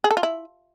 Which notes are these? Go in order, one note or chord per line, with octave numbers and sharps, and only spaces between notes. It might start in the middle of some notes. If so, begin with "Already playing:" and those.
G#4
A4
F4
E4